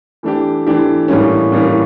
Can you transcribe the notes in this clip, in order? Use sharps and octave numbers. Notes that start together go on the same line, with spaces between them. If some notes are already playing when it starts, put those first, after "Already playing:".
E3 A3 D4 G4
E3 A3 D4 G4
A2 E3 G3 A#3 C#4
A2 E3 G3 A#3 C#4